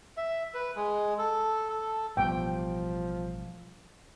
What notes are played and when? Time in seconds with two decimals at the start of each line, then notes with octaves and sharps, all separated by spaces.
0.17 E5
0.54 B4
0.76 G#3
1.18 A4
1.70 A4
2.17 A1 B2 F3 G3 G5